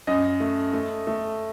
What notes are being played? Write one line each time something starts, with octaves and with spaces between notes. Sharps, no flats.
F#2 D#5
A3
A3
A3